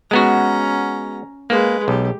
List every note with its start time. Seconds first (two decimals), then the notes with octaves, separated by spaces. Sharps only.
0.11 G#3 B3 C#4 F#4 A#5
1.50 G#3 A#3 B4
1.88 B1 G4